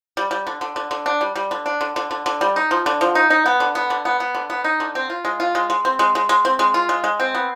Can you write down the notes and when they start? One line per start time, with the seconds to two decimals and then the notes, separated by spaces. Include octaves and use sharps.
0.17 G3
0.31 G3
0.47 D3
0.61 D3
0.76 D3
0.91 D3
1.06 D4
1.21 G3
1.35 G3
1.51 D3
1.66 D4
1.81 D3
1.96 D3
2.11 D3
2.26 D3
2.41 G3
2.56 D#4
2.71 F3
2.86 D3
3.01 F3
3.15 D#4
3.30 D#4
3.46 B3
3.60 D3
3.75 B3
3.90 D3
4.05 B3
4.20 B3
4.35 D3
4.50 B3
4.64 D#4
4.80 D3
4.95 C4
5.10 F4
5.25 G#3
5.40 F4
5.55 G#3
5.70 G#3
5.85 C4
5.99 G#3
6.15 G#3
6.29 G#3
6.45 C4
6.59 G#3
6.74 F4
6.89 G#3
7.04 G#3
7.20 C4
7.35 B3